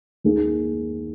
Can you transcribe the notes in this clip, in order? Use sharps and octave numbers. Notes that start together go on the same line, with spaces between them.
D#2 D#3 A#3 G#4